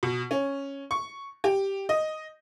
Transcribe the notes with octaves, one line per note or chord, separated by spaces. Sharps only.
B2
C#4
C#6
G4
D#5